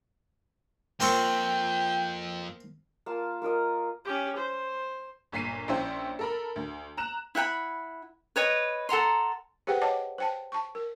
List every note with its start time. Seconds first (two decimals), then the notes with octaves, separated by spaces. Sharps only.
1.00 F2 A#3 C4 G5 C#6
3.06 A#3 F4 A5
3.42 A#3 F4 A#4 D#5
4.05 C#4 G4
4.36 C5
5.32 G1 A#2 B6 C7 D#7
5.68 A#1 C#4 E4 C5 G5
6.19 A4 A#4 B5
6.56 D2
6.97 A#5 F#6 E7
7.35 E4 F#5 G5 B5
8.36 B4 C#5 D#5
8.89 A4 F#5 A#5 C6
9.67 G4 G#4 B4 C5 F#5 G5
9.82 C#5 D#5 F#5 A5 D6
10.18 C5 G5 A5
10.52 A5 C#6
10.75 A#4